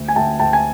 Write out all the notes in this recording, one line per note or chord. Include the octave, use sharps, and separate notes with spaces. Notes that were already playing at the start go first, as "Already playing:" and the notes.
Already playing: D2
G#5
D2 G5 A5
D2 G5 A5
G#5